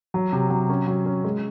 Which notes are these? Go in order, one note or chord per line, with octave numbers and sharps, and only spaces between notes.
F#3
C3
F#3
C#4
F#3
C#4
G#3